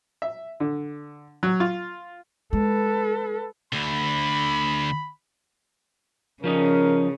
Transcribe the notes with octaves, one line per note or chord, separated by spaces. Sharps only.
E5
D3
F#3
F4
G#3 A4 B4
D2 D3 B5
C#3 F3 C#4 D#4 A#4